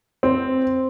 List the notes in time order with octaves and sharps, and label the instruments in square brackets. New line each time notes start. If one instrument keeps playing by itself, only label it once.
[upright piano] C4